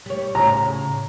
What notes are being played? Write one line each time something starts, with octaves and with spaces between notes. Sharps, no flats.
G3 C#5
A2 C#3 A#5